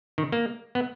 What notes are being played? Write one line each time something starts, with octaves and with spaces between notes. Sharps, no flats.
D#3
A#3
B3